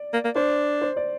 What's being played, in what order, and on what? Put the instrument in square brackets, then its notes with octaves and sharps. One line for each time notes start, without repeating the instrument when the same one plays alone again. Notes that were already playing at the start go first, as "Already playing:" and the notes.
Already playing: [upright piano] D5
[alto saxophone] A#3
A#3
[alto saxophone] D4 [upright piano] C5
[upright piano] C5
D5